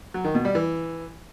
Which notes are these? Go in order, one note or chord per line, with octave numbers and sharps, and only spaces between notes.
F#3
D#3
B2
G3
E3